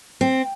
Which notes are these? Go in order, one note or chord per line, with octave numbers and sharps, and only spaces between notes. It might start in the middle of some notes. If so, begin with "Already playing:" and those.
C4